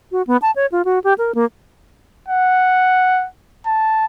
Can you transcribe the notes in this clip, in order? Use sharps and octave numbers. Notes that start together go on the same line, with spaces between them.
F#4
B3
A5
C#5
F4
F#4
G4
A#4
A#3
F#5
A5